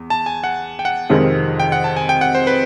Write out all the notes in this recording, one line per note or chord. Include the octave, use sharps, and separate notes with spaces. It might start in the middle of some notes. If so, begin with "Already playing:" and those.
Already playing: E2
A5
G#5
F#5
G5
F#5
F2 C3 D#3 G#3
G5
F#5
A5
G#5
G5
F#5
C5
B4